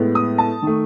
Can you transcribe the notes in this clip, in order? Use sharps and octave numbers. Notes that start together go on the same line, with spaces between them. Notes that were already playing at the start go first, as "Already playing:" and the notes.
Already playing: A2 G#3 B3
D#6
A5
D#3 A3